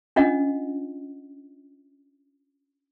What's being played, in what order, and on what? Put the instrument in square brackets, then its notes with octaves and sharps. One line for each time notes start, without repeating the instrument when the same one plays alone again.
[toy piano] C#4 D4 F4 D#5 F#5